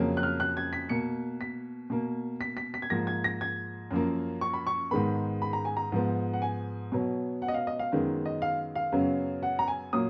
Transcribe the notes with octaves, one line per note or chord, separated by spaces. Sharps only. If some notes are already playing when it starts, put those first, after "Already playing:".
Already playing: F2 C#3 F#3 A#3
F#6
F6
F#6
G#6
B6
B2 A#3 C#7
B6
B2 A#3
B6
B6
B6
G#6
G#2 F3 A#3 A#6
G#6
A#6
G#6
F#2 F3 A#3
C#6
B5
C#6
G#2 D#3 G#3 B3 B5
B5
A#5
G#5
A#5
G#2 F3 B3
F#5
G#5
B2 F#3 B3
F#5
D#5
F5
D#5
F5
F#2 D#3 G#3 B3
D#5
F5
F5
F#2 C#3 F#3 B3
F#5
A#5
G#5
A#2 F#3 A#3 D#6